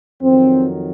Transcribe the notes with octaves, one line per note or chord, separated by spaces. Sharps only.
F2 D#3 F#3 C4